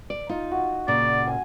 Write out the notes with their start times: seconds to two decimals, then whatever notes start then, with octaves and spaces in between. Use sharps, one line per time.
0.10 D5
0.29 D#4 F4
0.51 F#4
0.88 A#2 C#3 D5
1.27 G#5